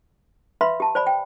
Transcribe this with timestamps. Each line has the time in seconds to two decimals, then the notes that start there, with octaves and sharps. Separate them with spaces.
0.61 B4 E5 F5 B5 C6
0.80 G4 A5
0.95 C5 D5 G#5 B5
1.07 G5